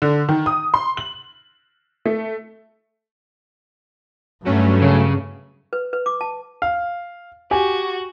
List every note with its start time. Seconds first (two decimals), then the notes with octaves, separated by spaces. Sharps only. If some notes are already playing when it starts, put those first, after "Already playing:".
0.02 D3
0.29 D#3
0.46 D#6
0.74 C6
0.97 F#7
2.06 A3
4.45 G2 F#3 A3 C#4
4.82 C#3
5.73 B4
5.93 B4
6.06 D6
6.21 A5
6.62 F5
7.51 F#4 G4 G#5